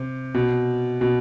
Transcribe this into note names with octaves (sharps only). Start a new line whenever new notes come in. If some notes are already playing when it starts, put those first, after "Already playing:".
Already playing: C3
B2
B2